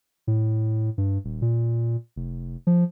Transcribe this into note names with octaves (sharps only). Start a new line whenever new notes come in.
A2
G2
D#1
A#2
F1
F3